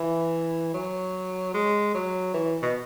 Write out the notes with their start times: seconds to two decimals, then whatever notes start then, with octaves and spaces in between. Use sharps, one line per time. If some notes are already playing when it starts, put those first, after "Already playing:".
Already playing: E3
0.74 F#3
1.54 G#3
1.95 F#3
2.34 E3
2.62 B2